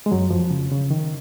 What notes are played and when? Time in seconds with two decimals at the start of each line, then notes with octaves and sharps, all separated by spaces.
0.06 G#3
0.11 F#2 F#3
0.31 F2 F3
0.51 C#3
0.71 C#3
0.91 D#3